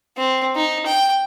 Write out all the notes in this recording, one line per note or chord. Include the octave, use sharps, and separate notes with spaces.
C4
D#4
G5